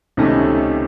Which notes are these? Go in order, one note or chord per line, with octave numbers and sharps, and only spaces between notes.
C#2 C3 D#3 A3 C#4